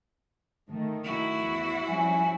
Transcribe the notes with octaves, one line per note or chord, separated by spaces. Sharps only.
D#3 A3
E4 F#4
E2
F3 G3 C#4 G#5